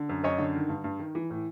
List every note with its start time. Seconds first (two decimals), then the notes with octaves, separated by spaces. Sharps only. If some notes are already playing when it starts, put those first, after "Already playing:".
Already playing: D3
0.09 F#2
0.23 F#2 C#5 D#5
0.39 D3
0.55 D#3
0.69 G2
0.84 G2
0.99 D#3
1.15 E3
1.30 A2